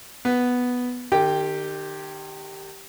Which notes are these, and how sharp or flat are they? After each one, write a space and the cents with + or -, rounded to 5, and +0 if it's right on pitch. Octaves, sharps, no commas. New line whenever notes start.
B3 +0 B4 +0
D#3 -40 G4 +0 G5 +0